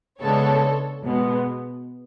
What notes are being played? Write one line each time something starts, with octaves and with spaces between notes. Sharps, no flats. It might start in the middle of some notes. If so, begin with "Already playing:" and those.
C#3 G#3 B3 D4 A4 C#5
B2 G#3 B3